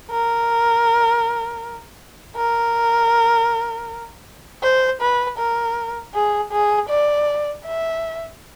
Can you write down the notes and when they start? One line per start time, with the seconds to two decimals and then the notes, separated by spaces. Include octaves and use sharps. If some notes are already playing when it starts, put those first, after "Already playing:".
0.11 A#4
2.36 A#4
4.63 C5
5.01 B4
5.38 A#4
6.14 G#4
6.52 G#4
6.89 D5
7.65 E5